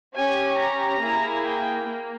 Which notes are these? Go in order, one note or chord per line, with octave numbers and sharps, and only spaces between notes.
C#4 G4 G#5
A#5
A#3 E4 G#4
G5
A#3